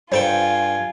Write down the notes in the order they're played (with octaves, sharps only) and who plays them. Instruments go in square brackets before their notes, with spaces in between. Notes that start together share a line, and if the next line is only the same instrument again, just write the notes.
[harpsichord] G2 A4 G5 [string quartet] F4 [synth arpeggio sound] C5 A#5 [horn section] G#5